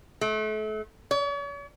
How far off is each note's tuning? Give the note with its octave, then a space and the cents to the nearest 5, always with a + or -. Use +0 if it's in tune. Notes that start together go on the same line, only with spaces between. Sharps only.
A3 -35
C#5 +45